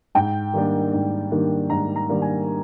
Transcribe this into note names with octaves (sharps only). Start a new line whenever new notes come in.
G#2 G5
D#3 G3 A#3 D4
G#2
D#3 G3 A#3 D4
G#2 A#5
A#5
D#3 G3 A#3 D4
G#5